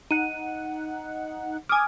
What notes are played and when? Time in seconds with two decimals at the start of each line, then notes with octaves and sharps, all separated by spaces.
0.11 D#4 F#5 D#7
1.69 G#5 D6 D#6 F6 G#6